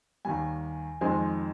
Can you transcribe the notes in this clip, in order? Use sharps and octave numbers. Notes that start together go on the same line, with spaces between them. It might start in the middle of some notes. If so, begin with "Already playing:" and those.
D#2 D#3 G3 G#5
F2 D#3 G#3 C4 D#4 G#5